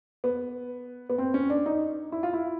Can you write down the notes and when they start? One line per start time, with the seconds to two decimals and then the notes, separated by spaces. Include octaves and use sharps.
0.24 B3
1.10 B3
1.18 C4
1.34 C#4
1.50 D4
1.66 D#4
2.12 E4
2.23 F4
2.33 E4